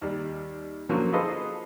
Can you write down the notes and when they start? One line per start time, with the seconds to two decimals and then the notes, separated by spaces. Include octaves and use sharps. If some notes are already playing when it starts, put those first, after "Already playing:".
0.02 D#2 G3
0.89 D3 F3 F#3 A#3 C#4 F4
1.12 F4 G#4 A4 B4 C5 D#5